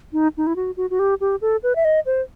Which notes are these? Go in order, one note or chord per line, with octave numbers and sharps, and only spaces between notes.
D#4
D#4
E4
F#4
F#4
F#4
G4
G4
A4
B4
E5
D#5
C5